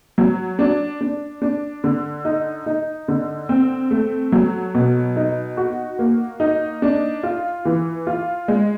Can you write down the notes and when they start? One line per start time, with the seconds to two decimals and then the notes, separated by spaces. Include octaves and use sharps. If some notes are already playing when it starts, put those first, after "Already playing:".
0.18 F#3
0.59 D4
1.01 D4
1.42 D4
1.84 D3
2.25 D#4
2.66 D#4
3.08 D3
3.49 C4
3.91 A3
4.32 F#3
4.75 B2
5.16 D#4
5.57 F#4
5.99 A#3
6.40 D#4
6.82 D4
7.23 F4
7.65 E3
8.07 F4
8.48 G#3